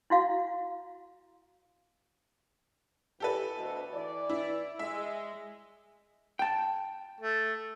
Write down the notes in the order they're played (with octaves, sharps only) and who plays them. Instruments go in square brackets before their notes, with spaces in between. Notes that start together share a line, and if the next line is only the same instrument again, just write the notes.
[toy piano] E4 F#4 F5
[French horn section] E3 [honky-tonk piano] G4 A4 B4
[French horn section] D2 B2
E3 D5
[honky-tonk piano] E4
[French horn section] G#3 [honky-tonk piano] E5
[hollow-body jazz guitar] G5 A5
[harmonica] A3